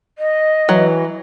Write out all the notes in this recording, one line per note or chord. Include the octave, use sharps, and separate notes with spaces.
D#5
E3 F#3